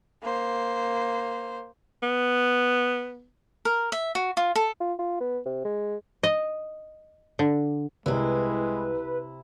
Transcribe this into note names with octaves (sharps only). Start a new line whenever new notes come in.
A#3 C5
B3
A#4
E5
F#4
F4
A4
F4
F4
B3
C3
G#3
D#5
D3
C2 C3 G#3 E4 B4